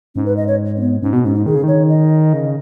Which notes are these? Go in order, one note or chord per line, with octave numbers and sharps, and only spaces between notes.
G#2 C#4
B4
D#5
C#5
C#4
B3
G#2 C#4
B2 B3
G#2 C#4
D#4
D#3 G#4
C#3
D#3 C#5
D#5
C#3